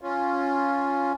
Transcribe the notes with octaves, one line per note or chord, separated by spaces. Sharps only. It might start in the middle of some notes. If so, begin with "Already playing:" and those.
C#4 F4